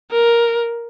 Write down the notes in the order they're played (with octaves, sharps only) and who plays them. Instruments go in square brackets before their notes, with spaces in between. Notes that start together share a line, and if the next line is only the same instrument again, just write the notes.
[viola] A#4